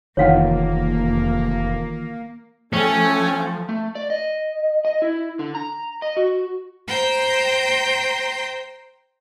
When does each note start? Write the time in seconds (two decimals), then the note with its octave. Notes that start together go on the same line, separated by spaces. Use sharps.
0.17 F1 D#3 E3 A#3 F4 C#5 F5 F#5
2.73 F3 A3 C#4 G5 G#5
3.69 A3
3.95 D5
4.10 D#5
4.85 D#5
5.02 E4
5.39 D3
5.55 A#5
6.02 D#5
6.17 F#4
6.88 C5 G5 A#5 C6 G6